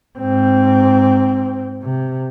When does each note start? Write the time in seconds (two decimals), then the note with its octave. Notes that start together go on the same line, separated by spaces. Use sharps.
0.18 G#2 C4
1.83 C3